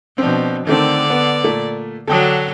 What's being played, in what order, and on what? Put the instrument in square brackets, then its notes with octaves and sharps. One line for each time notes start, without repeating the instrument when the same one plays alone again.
[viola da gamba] B2 F3 [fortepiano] C4 D4
[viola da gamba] D3 D5 [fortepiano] D#3 A3 C4
[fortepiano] B3
A#2 A3
[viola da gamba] D3 F#3 D4 [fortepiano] A4 G5 D#6